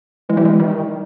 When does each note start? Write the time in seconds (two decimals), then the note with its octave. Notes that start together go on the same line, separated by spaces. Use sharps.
0.29 E3 G#3
0.37 G3
0.45 G#3
0.60 D#3 G3